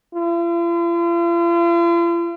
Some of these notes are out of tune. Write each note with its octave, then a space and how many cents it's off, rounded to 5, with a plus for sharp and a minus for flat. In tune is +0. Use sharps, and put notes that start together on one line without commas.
F4 -45